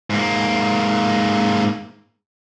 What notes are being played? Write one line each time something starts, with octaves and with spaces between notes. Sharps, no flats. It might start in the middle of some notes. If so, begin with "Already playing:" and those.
G#2 A#3